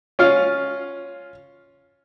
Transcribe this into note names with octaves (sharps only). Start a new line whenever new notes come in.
C#4 F4 F5